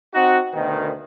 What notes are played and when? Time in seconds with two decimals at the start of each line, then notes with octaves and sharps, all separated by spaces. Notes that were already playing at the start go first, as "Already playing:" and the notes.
0.15 C4 D#4 F#4
0.54 D2 B2 D#3